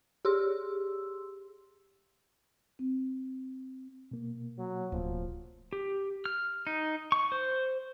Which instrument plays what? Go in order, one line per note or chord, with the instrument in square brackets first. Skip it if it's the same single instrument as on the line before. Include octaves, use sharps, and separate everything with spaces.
[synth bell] G4 G#4 C6 E6
[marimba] C4
[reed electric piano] B2 A#3
[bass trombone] F#3
[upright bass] D1 [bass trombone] F3
[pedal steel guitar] G4
F6
D#4
C#6
C5